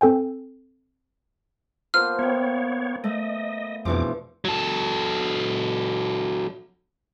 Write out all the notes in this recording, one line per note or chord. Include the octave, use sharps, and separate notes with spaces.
C4 A4 G5 G#5
F3 A#3 B3 C5 F6
B3 C#5 E5 G5
A3 D#5
F2 B2 E3 F3 D4 G#4 D6
F#3 A4